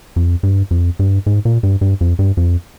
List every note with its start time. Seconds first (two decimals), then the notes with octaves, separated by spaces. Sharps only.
0.16 F2
0.43 G2
0.71 F2
0.99 G2
1.26 G#2
1.45 A#2
1.63 G2
1.81 G2
2.01 F2
2.19 G2
2.37 F2